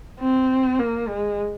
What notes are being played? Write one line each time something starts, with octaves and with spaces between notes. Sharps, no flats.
C4
A#3
G#3